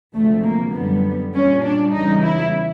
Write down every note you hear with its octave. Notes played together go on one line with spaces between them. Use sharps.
D2 C3 F3 G#3 A3
A#3
F#2 D3 G3 B3
A#2 G3 C#4
D4
E2 C#3 E3 G3 D#4
E4